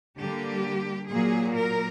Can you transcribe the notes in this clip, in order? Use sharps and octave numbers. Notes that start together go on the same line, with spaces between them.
D3 G3 A#3 G4
A#2 F#3 A#3 G#4
A#4